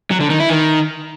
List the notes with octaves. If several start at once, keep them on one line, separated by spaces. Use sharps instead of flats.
F#3
D3
D#3
E4
D#3